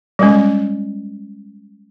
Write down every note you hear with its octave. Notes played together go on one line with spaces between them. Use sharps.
G3 G#3 C#4